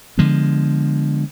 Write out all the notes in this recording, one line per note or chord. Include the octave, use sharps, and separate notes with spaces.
D3 F3 G#3 B3